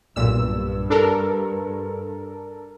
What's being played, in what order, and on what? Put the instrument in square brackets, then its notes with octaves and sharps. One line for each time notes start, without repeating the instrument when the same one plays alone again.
[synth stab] B1 A#2 E6 [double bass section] G2
[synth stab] D4 A4 A#4